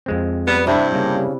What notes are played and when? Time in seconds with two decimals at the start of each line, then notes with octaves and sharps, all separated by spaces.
0.06 F2 G#3 C4
0.47 G3 B3 B4
0.67 G2 C3 D4 E4 E5
0.92 C#3 G3 A#3